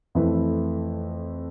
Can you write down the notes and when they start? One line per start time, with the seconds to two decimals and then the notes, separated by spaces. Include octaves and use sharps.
0.15 F2 E3 A3 E4 B4